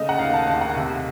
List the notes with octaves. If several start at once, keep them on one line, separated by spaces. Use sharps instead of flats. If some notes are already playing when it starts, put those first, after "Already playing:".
Already playing: C#3 A3 D#5
F#5
D#2 F5
A5
D#2 A5
F#5
C3